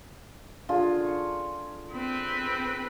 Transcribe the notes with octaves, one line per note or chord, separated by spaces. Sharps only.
D3 F4 G#4
C#6
C4 B4